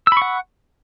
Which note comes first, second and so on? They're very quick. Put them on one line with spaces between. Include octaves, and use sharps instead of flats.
E6 B5 C#6 F#5